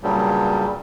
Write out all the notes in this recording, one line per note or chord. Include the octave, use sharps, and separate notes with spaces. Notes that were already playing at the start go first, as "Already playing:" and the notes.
G2 A#2 C#3 F#3 G3